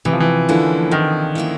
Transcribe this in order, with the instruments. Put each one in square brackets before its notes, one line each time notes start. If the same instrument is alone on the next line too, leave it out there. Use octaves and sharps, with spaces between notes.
[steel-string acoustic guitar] C3 [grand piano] E3
[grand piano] F3
E3
[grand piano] D3 [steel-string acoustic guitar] F3 A#3 C#4 E4
[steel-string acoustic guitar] C3 [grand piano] D#3
[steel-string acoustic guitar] F3 A#3 C#4 E4